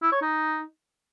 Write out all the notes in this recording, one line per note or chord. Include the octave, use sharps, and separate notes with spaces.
E4
C#5
D#4